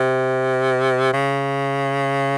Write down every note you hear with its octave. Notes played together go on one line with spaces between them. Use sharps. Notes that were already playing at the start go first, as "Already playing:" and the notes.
Already playing: C3
C#3